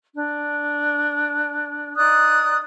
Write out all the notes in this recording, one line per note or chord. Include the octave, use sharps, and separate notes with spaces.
D4
D#4 D5 D#6 F#6